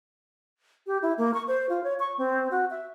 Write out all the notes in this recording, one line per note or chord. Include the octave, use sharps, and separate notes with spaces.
G4
E4
A#3
C#6
C5
F4
C#5
C#6
C4
F#4
E5